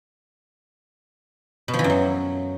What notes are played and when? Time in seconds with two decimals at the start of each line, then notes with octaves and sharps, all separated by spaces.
1.68 B2
1.74 F3
1.79 E3
1.84 F#2
1.90 F#3